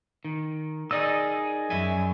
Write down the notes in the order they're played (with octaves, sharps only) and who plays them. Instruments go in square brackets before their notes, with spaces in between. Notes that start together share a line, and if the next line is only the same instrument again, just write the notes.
[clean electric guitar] D#3
[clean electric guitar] D#4 A#4 D#5 [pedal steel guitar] G#4 D5 E6
[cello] F#2 [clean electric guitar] E5 G#5